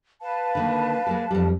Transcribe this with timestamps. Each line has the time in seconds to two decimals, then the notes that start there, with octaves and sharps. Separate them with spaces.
0.22 B4 F5 A5
0.55 D3 D#3 A#3
1.07 G#3 A#3 A4
1.31 F2 G3